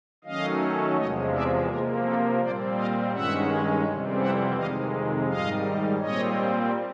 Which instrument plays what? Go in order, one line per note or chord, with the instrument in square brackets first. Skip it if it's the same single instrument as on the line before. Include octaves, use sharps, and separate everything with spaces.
[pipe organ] D#3 F#3 A3 C#4 D#5 F5
E2 C3 F3 G#3 C#5 D#5
D5 E5
C3 F3 A#3 G#4 A#4
G4 A4
A#2 G3 C4 C5 D5
D#5 F5
G2 D#3 G#3 C#4 E5 F#5
F2 C3 E3 G3 C4
E5 F#5
F2 C3 D#3 G#3 D#5 F5
G#2 D#3 G3 D#5 F5
A#2 G3 C4 C#5 D#5